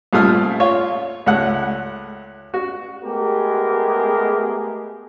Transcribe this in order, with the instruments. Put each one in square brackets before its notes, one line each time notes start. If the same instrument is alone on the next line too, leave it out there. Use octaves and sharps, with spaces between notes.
[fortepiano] C2 A#2 A3 D#6 F6
F4 C#5
C#2 A3 F#5 F#6
F#4
[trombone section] G#3 A3 B3 G4 G#4 A#4